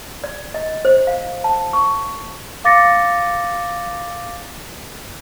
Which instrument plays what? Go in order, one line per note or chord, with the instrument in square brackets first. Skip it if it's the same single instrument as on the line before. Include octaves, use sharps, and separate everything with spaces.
[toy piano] D5
D#5
C5
F5
A5
C#6
[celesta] F5 D6 A6 A#6 C#7